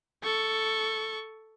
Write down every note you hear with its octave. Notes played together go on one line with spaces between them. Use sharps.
A4 C#6